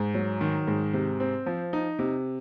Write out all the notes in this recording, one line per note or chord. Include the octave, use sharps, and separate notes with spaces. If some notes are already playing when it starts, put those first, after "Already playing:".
Already playing: G#2
F#3
D#3
G#2
C3
C4
F3
D#4
C3